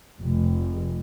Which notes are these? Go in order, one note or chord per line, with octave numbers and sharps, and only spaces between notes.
F1